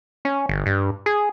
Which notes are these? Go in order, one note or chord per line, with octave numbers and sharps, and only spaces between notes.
C#4
G1
G2
G#4